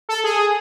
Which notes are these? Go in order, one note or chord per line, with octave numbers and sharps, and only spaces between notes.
A4
G#4